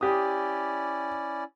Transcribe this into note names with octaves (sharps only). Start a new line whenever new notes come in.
C#4 E4 G4 D5 D#6